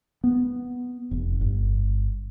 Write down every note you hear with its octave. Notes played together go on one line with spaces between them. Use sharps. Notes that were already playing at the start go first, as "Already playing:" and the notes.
B3
F1
G1